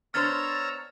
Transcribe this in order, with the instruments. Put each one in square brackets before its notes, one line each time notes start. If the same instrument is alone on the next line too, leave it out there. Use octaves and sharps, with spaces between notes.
[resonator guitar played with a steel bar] B3 D4 C5 [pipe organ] C#5 A#5 E6 [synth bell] F6 A6